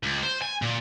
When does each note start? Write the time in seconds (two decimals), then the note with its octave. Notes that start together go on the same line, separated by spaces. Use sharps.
0.03 C#2
0.23 C5
0.42 G#5
0.62 A#2